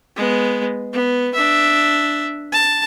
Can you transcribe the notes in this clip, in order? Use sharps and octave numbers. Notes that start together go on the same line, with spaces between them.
G#3 B3
B3
D4 E5
A5